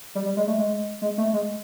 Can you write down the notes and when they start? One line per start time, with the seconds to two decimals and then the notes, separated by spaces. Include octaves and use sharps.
0.15 G3
0.26 G3
0.37 G#3
0.47 A3
0.58 G#3
1.02 G#3
1.18 A3
1.33 G#3